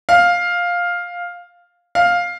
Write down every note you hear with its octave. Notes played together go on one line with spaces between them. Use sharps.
F5
F5